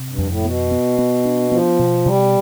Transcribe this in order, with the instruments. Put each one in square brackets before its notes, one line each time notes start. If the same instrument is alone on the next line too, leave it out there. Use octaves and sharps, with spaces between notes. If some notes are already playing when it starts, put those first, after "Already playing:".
Already playing: [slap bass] C3
[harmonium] G2
[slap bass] F2
[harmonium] A2
[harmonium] B2 [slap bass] B3
[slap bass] B3
B3
D4
[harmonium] F3 [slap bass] B3
[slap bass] B2
[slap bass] B2 [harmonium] G3